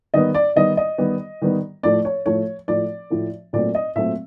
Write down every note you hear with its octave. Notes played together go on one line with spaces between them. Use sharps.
D#3 G3 B3 D#5
D5
D#3 G3 B3 D#5
D#5
D#3 G3 B3
D#3 G3 B3
A2 F3 A3 D5
C#5
A2 F3 A3 C#5
A2 F3 A3 D5
A2 F3 A3
A#2 F#3 A3 C4 D5
D#5
A#2 F#3 A3 C4 E5